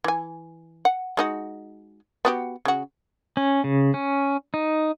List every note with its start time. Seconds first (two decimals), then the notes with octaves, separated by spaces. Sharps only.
0.04 E3 G#5
0.85 F#5
1.17 G#3 D#4 F#4
2.25 B3 F#4 G4
2.65 C#3 F#4
3.37 C#4
3.64 C#3
3.94 C#4
4.54 D#4